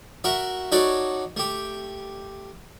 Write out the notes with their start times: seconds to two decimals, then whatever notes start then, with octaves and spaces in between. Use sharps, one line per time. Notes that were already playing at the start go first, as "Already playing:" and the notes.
0.24 F#4 A#4 E5
0.72 D#4 F#4 A4 C#5 D5
1.37 A3 G4